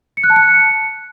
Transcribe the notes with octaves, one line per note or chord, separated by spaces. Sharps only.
C#7
F#6
A5
C#7